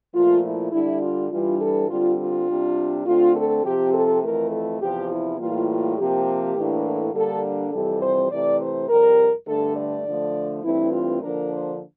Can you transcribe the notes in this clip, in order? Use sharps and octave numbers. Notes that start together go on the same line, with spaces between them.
A#2 F3 A3 F4
E4
D3 G3 D4 E4
F4
G2 E3 G3 D4 F4
A4
D3 G3 C4 F4
F4
C3 G3 D4
D3 A3 C4 F4
A4
C3 F3 C4 G4
A4
F2 E3 A3 A#4
A4
E2 C3 F3 G4
E4
A2 E3 G3 A#3 F4
F4
C3 F3 A#3 G4
A2 E3 A#3 D4
A4
D3 G3 A#3 D4 A4
F2 C3 E3 G3 C4 A4
C5
C3 E3 A3 D5
C5
F2 C3 G3 A#4
G2 D3 A3 A4
D5
D3 F3 A3
G2 E3 A3 C4 E4
F4
D3 F3 A#3 D4 A#4
C5